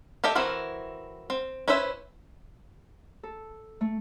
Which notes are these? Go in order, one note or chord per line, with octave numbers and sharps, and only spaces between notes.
G4 A4 D#5 E5 G5
E3 C4 E4 F#4 A#4
C4
C#4 E4 B4 C5 E5
A4
A3